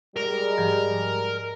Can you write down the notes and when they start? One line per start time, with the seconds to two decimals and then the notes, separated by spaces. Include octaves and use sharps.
0.16 G3 G#3 G#4 A#4
0.58 G#2 F3 G4